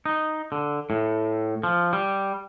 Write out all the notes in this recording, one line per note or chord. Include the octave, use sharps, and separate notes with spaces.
D#4
D3
A2
F3
G3